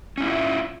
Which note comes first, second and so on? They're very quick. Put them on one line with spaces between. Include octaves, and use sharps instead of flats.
C#4 E4 F4 D#5 E5